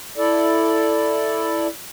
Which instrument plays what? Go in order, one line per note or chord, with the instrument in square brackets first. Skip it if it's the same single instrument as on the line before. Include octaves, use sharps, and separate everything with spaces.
[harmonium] E4 A4 D5